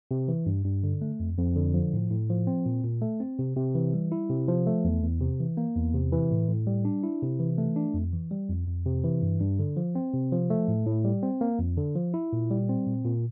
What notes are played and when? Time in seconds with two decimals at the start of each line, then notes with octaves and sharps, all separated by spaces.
0.11 C3
0.28 E3
0.46 G2
0.65 G2
0.84 D3
1.01 A3
1.20 F2
1.38 F2
1.56 D3
1.74 F3
1.93 A2
2.11 A2
2.30 F3
2.47 C4
2.66 A#2
2.84 A#2
3.02 A3
3.20 C4
3.39 C3
3.57 C3
3.75 E3
3.93 G3
4.12 E4
4.30 C3
4.48 F3
4.67 A3
4.84 E2
5.03 E2
5.21 C3
5.40 E3
5.57 A#3
5.75 E2
5.94 C3
6.12 E3
6.31 A2
6.49 A2
6.67 G3
6.85 D4
7.03 E4
7.22 C3
7.40 E3
7.58 A3
7.76 D4
7.94 F2
8.13 E3
8.31 G3
8.49 F2
8.67 F2
8.86 C3
9.04 E3
9.22 G2
9.40 G2
9.59 D3
9.77 F3
9.95 C4
10.14 C3
10.32 F3
10.50 A3
10.68 A2
10.86 A2
11.05 G3
11.23 C4
11.41 A#3
11.59 F2
11.78 D3
11.95 F3
12.14 E4
12.33 A#2
12.51 G3
12.69 C4
12.87 A#2
13.05 A#2